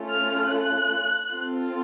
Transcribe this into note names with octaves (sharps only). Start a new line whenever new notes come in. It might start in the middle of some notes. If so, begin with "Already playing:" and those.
Already playing: A3 C#4 F4 A4
F6
F#6
C4 F4 A4